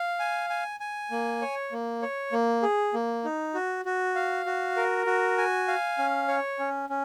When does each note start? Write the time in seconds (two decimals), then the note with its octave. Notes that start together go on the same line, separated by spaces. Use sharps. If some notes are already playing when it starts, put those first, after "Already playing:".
Already playing: F5
0.19 G#5
0.50 G#5
0.80 G#5
1.11 A#3
1.42 C#5
1.72 A#3
2.02 C#5
2.32 A#3
2.63 G#4
2.94 A#3
3.25 D#4
3.54 F#4
3.85 F#4
4.15 F5
4.46 F#4
4.76 A#4
5.06 F#4
5.38 G#5
5.68 F5
5.98 C#4
6.28 C#5
6.59 C#4
6.90 C#4